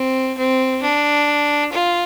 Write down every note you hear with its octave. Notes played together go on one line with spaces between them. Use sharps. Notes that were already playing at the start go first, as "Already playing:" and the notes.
Already playing: C4
C4
D4
F4